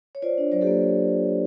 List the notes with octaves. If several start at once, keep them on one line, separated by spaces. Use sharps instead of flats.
C#5
F4 C5 D5
D4
F#3 C5 D5
G4 A4
A#3